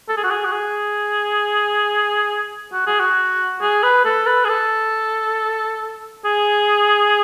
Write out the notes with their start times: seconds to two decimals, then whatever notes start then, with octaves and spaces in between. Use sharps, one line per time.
0.09 A4
0.17 G#4
0.24 F#4
0.31 G#4
0.45 F#4
0.53 G#4
2.73 F#4
2.87 G#4
3.00 F#4
3.61 G#4
3.83 B4
4.05 A4
4.27 B4
4.45 G#4
4.49 A4
6.25 G#4